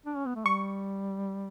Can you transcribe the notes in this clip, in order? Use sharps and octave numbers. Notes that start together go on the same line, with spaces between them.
D4
C#4
B3
A3
G3 C#6